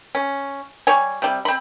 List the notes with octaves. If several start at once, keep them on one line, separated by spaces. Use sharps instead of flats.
C#4
G3 C#5 G#5
C3 G3
C4 B5